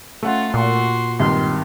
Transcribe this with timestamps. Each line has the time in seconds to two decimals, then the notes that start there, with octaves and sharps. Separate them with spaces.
0.23 A3 C#4 F4 F#5
0.54 A#2 F#4 C6
1.19 G#1 G2 D#3 C6